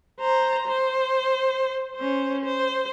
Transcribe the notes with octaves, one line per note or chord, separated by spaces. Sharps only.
C5 A#5
C5
C#4 C5
C5